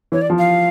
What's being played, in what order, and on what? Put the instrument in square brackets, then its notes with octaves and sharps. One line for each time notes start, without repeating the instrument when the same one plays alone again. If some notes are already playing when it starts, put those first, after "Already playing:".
[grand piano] E3 [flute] C#5
[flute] D5
[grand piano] F3
[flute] F5